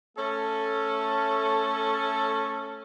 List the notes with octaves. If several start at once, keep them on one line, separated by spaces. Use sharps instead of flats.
A3 C#4 A4